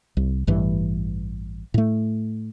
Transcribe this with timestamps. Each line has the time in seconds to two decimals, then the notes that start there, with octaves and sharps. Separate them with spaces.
0.17 C2
0.47 A1 G2 E3
1.74 A2 A3